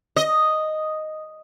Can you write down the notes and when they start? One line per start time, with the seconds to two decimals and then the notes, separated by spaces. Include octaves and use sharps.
0.16 D#5